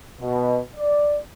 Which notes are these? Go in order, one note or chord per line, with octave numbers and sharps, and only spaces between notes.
B2
D5